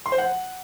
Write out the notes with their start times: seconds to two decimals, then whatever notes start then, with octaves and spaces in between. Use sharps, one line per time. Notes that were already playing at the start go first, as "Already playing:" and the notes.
0.06 C6
0.12 C5
0.18 F#5